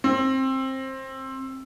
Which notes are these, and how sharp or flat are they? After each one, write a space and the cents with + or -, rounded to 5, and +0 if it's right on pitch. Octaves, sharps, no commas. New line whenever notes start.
C4 +20